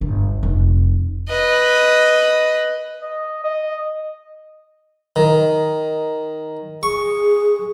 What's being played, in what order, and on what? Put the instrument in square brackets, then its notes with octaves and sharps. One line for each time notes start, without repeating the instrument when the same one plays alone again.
[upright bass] G1
F1
[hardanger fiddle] B4 D#5
[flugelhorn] D#5
D#5
[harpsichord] D#3
[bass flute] G#4 [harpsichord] C#6